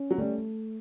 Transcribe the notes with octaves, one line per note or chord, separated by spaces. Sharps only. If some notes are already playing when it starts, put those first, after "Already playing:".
Already playing: C#4
F#3
G3 A3